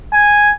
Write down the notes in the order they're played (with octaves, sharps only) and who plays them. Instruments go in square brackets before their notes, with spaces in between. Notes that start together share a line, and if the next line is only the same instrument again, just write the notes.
[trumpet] G#5